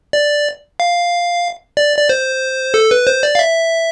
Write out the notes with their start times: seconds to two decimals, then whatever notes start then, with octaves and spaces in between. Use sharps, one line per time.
0.13 D5
0.80 F5
1.77 D5
1.98 D5
2.09 C5
2.74 A4
2.91 B4
3.07 C5
3.23 D5
3.35 F5
3.39 E5